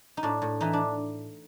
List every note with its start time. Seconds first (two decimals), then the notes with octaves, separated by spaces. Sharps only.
0.17 D#4
0.23 A2 D4
0.42 A2
0.61 E3 D#4
0.73 D4